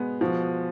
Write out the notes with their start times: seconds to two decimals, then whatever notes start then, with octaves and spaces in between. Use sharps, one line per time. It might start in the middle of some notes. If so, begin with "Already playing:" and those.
Already playing: B2 G#3 B3
0.21 B2 F3